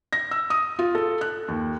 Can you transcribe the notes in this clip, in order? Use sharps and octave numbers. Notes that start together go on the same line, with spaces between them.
A#6
E6
D#6
F4
A4
F#6
D#2